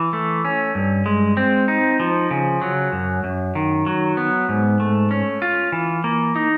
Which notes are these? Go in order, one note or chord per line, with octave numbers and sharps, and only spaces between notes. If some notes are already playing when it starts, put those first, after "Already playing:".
Already playing: E3
A3
C#4
G2
G#3
C4
D#4
F3
C#3
F#3
F#2
F#2
D#3
F#3
B3
G#2
A3
C#4
F4
E3
A#3
D#4